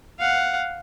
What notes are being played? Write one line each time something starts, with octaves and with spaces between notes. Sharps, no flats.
F5 F#5